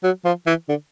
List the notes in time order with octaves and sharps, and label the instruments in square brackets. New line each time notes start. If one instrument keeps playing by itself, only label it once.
[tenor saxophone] F#3
F3
E3
D3